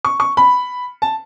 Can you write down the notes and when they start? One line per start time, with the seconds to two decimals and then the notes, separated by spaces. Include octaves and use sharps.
0.05 C#6
0.20 C#6
0.37 B5
1.02 A5